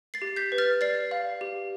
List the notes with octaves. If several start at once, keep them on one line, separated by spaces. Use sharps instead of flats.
A6 C7
G4
G6 B6
B4
F6 A6
D5 A6 C7
F5
G4